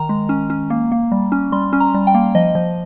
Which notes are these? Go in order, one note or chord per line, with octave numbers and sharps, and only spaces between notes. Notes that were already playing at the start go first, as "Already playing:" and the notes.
Already playing: D#3 A#5
G#3
C#4
C#4
A#3
A#3
G3
C#4
G3 C6
C#4
A#5
G3
G5
A#3
F3 D#5
F3